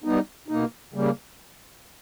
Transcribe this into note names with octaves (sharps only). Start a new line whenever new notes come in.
G3 B3 D#4
B2 A#3 D#4
C#3 G3 A#3